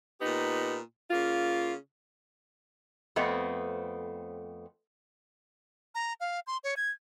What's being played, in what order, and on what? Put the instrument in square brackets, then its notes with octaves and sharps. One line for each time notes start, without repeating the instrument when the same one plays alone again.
[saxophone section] A#2 B3 D#4 G4
C#3 A#3 F4
[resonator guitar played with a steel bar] F2 A3 B3 C4
[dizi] A#5
F5
C6
C#5
G#6